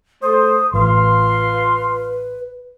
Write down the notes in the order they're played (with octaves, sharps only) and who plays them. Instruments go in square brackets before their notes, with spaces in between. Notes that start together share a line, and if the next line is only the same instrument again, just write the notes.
[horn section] A3 C5 [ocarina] D#6
[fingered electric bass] A1 [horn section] F4 F5 C6 [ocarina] B4